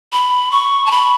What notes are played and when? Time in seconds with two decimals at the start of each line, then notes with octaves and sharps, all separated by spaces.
0.13 B5
0.52 C#6
0.86 A5
0.91 B5